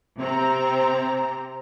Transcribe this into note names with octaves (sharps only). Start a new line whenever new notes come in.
C3 C4 A#5